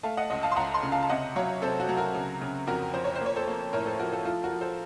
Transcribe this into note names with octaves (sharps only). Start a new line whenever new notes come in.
A3 F5 A5
D#5 F#5
C#2 D#5 F#5
F5 A5
C6
C#2 F#5 A#5
A5 C6
C#3
F5 A5
A5
C3 D#5 F#5
F#3 C#5 F5
C3 A4 C5
F#4
F#3
F#4 A#4
C#3
C#3
F2 F#4 A#4
F2 C5
C#5
A#3 C5
C#5
A4 C5
A#3
A2 A#4 C#5
A4 C5
F3 F#4 A#4
F4 A4
F3 F4 A4
F#4 A#4
F3
A4 C5